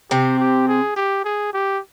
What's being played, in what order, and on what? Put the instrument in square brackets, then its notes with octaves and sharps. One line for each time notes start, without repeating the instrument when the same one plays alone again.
[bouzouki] C3 C4 [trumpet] G4
[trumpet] G4
G#4
G4
G#4
G4